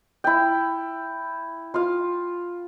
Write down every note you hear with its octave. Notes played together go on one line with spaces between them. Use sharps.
E4 G5
F4 F5